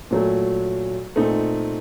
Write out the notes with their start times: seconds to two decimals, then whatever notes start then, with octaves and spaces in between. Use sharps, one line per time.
0.11 A#2 F#3 A3
1.16 A#2 A3 C4 D#4